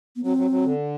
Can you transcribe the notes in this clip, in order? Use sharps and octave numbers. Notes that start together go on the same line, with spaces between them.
B3
F#3 C4
F#3
F#3
D3